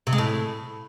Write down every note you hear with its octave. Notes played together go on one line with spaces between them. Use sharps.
C3
G#3
A2